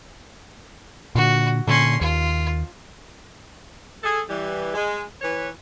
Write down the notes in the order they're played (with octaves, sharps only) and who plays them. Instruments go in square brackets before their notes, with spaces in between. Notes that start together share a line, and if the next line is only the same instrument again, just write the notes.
[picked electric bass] A#2 D3 [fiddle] F#4
[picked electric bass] A#2 D3 [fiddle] C#4 C6
[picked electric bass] D#2 [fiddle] F4
[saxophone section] G#4 A4
E3 G3
G#3
E3 B4 C#5